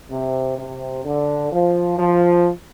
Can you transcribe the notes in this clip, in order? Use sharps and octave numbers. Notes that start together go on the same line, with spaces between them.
C3
C3
D3
F3
F3